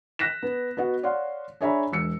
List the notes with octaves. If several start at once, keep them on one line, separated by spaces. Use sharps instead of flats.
F#6 A#6 B6 E7
B3
B3 F#4 D#5 F#5
C#5 D5 F5 F#5 C6
D4 G#4 C#5 E5 A#5 B5
E1 E6 C#7